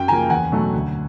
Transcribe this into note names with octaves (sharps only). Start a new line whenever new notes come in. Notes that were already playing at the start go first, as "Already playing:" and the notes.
Already playing: F#2 G5
C#3 F3 A#3 G#5 A#5
E2 F#5 G#5
B2 F#3 A3
D2